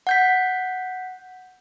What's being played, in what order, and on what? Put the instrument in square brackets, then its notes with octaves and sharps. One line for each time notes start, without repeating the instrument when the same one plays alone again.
[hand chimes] F#5 G6 B6